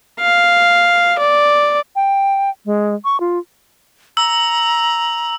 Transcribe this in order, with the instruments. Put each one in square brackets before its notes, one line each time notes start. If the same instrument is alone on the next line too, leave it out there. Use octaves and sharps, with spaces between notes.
[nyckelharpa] F5
D5
[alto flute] G5
G#3
C#6
F4
[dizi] A#5 [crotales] E6